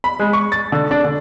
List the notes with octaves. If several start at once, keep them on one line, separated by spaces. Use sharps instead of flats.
B5
G#3
C#6
A6
D3
D4
D3